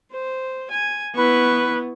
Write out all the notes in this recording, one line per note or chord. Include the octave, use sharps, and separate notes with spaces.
C5
G#5
B3 E4 B4 C#6